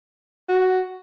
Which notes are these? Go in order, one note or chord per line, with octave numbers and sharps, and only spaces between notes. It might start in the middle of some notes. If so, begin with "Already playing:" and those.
F#4